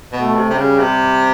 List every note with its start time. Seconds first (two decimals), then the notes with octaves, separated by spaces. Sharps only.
0.12 B2
0.20 A3
0.35 C3
0.50 C3 G3
0.57 C#3
0.79 C3